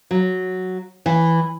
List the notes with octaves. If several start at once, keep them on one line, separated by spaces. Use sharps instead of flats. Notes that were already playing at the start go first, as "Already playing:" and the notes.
F#3
E3